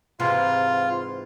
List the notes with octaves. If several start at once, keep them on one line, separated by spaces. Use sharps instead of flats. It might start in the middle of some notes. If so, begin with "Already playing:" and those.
G#2 C3 E3 F4